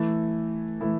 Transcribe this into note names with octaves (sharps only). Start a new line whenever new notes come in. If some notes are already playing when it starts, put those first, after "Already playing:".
Already playing: E3 A3 E4
E3 A3 E4